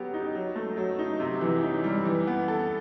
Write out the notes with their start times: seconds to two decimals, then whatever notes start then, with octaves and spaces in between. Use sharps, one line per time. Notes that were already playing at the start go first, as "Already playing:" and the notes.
Already playing: F#3 B3 G4
0.14 D#4
0.34 F#3
0.56 A3
0.77 F#3
0.99 D#4
1.20 C3
1.41 E3
1.63 D#4
1.84 G3
2.05 E3
2.27 B3
2.48 A4